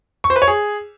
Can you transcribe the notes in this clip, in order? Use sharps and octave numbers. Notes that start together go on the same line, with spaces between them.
C#6
C5
B4
C#5
G#4